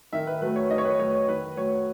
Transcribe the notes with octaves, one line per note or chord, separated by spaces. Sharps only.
D#3 E5
B4
F#3 A3 B4
C#5
D#3 D#5
C#5
B4
F#3 A3 C#5
C#5
D#3 B4
F#3 A3 C#5